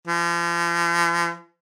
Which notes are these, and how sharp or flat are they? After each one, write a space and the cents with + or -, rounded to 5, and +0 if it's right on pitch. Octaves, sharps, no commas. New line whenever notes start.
F3 -40